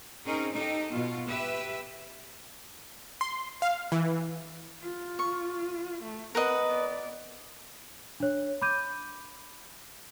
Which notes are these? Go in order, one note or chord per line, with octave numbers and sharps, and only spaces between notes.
C4 C#4 D#4 G#4 A#4
D#4 G4 A4
B2 F4
G4 B4 E5
C6
F5
E3
F4
C#6
A3
C4 A#4 B4 D#5 F#5
B3 D5
D4 C#5
B5 D6 G6 D#7